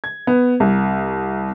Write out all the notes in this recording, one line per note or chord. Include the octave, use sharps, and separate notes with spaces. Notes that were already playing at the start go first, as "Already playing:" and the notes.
G#6
B3
C2